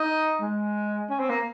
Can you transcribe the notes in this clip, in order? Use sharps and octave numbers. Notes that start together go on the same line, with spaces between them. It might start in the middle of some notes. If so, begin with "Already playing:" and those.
Already playing: D#4
G#3
C#4
C4
A#3